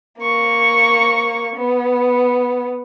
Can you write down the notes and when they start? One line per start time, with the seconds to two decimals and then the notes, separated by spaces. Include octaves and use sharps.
0.19 A#3 C#6
1.56 B3